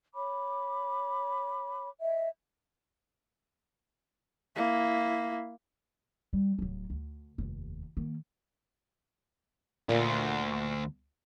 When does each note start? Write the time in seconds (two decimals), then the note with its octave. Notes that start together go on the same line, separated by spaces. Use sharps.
0.15 C#5 B5 D6
2.00 D#5 E5
4.56 A#3 E4
6.33 G3
6.58 D1 F#3
6.90 D2
7.38 F1 D#2
7.97 D#3 A#3
9.89 D2 A#2